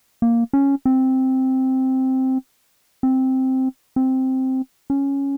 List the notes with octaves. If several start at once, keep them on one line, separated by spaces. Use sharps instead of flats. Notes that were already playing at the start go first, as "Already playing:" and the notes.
A#3
C#4
C4
C4
C4
C#4